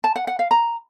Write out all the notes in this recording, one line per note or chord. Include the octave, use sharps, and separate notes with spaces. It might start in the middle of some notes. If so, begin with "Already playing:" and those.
A5
F#5
F#5
F5
A#5